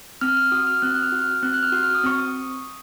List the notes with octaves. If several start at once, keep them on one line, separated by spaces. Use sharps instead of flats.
C4 F6
F6
F#4 D#6
F6
C4 F#6
F#6
F6
F#4
F6
C4 F#6
F#6
F6
F#4
F6
D#6
C4 C#6
D#6